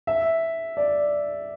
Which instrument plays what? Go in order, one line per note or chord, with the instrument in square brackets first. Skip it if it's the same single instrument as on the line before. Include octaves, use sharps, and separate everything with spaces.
[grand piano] E5
D5